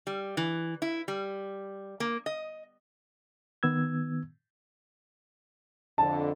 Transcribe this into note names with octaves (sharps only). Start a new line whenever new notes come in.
G3
E3
E4
G3
A#3
D#5
D#3 B3 E6 G#6
F2 D3 A5